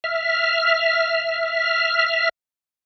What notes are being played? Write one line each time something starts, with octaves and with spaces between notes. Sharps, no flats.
E5 F6